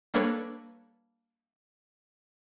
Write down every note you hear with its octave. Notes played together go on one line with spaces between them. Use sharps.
G3 A#3 D4 A4 B4 C#5